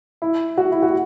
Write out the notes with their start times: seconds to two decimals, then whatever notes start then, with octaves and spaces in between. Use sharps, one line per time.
0.22 E4
0.57 F#4
0.72 E4
0.82 F#4